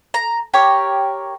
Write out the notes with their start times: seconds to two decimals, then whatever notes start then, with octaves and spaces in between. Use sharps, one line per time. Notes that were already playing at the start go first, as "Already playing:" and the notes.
0.14 A#5
0.54 G4 A#4 C#5